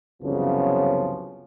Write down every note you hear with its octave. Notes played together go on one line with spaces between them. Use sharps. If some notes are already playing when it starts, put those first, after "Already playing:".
C2 F#2 C#3 F3 B3 C#4